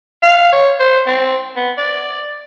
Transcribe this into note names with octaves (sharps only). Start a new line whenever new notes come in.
F5
C#5
C5
C4
B3
D5